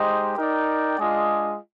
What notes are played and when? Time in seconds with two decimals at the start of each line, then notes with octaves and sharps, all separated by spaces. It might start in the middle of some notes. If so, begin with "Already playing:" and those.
Already playing: G#3 D#4 G4 C5 D#5
0.37 D#4 A#4 D5 G5
0.98 G#3 D4 F4 G#4 D#5